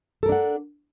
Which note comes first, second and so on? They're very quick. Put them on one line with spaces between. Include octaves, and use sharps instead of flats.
A4 A#4 D4 F#5